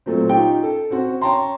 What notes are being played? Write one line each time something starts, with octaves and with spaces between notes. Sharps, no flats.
A#2 F#3 A3 A#3 C4
C#4 D#4 F4 G4 G5
A4
C4 C#4 F#4 C5
C#4 C#5 G5 A5 A#5 C6